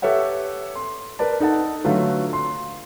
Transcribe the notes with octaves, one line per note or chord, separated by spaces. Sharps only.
G4 A4 B4 C#5 E5 F#5
C6
A#4 B4 D5 A5
D#4 A4 F#5 A5
D3 F#3 A3 F4 F#4 B4
C6